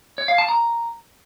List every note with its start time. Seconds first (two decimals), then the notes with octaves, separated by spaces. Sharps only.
0.18 C#5
0.28 F5
0.38 A5
0.49 A#5